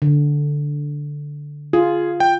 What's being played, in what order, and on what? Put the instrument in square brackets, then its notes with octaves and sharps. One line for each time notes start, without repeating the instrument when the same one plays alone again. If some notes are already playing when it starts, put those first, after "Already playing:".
[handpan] D3
[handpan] F4 [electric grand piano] G#4
[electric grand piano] G5